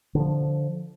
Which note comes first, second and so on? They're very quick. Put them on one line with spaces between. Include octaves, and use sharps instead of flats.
D3 D#3 F3